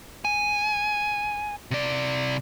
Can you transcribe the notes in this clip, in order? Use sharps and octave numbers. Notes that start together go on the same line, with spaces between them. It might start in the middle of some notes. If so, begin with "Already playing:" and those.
G#5
C3 D5